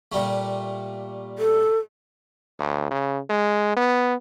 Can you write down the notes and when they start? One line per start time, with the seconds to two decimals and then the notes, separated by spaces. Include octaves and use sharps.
0.12 A#2 G3 A3
1.38 A4
2.59 D2
2.91 C#3
3.30 G#3
3.76 B3